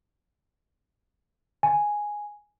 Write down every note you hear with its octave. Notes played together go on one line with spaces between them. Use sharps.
G#5